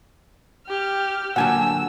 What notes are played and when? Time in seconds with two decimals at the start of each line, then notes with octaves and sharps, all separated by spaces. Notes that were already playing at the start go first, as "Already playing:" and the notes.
0.67 G4 F6
1.36 A#2 D3 F#3 F#5 G#5 A5 E6